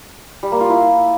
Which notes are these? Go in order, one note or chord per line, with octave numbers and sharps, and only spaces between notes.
G3
A#3
F4
E4